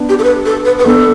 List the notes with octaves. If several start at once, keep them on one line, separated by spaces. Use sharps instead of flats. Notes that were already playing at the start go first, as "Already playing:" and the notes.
Already playing: B3 D4
G4
A4
B4
A4
B4
B4
B3 D4 A4